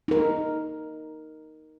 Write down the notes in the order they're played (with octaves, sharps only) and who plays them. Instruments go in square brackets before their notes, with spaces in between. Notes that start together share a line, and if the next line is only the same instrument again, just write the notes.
[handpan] D#4 A#4